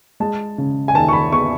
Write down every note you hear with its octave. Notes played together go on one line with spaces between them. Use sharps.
G#3 A5
C#3
G#5
D#2 A5
C#6
B5
B3 C#6